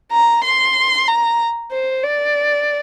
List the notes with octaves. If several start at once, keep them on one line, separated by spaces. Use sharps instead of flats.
A#5
C6
A#5
C5
D5